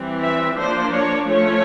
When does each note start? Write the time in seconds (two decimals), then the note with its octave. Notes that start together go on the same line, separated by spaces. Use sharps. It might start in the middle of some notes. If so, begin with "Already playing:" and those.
Already playing: E3 G3 C4
0.21 E5
0.56 F3 A#3 D4 C5
0.93 C#5
1.27 F3 A3 C#4 C#5